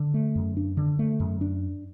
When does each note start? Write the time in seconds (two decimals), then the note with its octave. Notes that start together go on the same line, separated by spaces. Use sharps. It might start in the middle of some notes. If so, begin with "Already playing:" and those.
Already playing: D3
0.14 A3
0.35 F#2
0.57 D4
0.77 D3
0.99 A3
1.20 F#2
1.41 D4